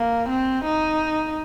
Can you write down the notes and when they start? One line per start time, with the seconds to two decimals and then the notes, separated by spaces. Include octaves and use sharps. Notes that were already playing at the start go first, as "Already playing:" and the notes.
Already playing: A#3
0.29 C4
0.65 D#4